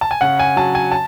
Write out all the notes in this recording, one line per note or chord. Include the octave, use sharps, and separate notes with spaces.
A5
G#5
C#3 F#5
G#5
F#3 A5
G#5
A5